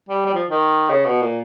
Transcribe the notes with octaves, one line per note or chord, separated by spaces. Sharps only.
G3
G3
F3
D#3
C#3
B2
A#2